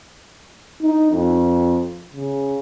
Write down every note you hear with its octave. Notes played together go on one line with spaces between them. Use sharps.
D#4
F2
C#3